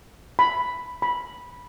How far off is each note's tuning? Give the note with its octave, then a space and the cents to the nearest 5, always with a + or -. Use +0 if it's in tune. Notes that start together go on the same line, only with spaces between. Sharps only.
B5 +5
B5 -15